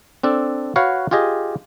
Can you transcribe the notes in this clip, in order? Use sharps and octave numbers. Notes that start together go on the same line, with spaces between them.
C4 D4 A4
F#4 B4 C#5 F5 F#5
F4 G4 G#4 D#5